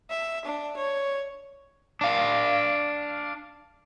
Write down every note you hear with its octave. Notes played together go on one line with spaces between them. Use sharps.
E5
D4
C#5
D4 F5